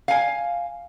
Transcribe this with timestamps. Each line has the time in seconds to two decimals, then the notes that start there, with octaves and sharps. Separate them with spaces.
0.08 F5 G#5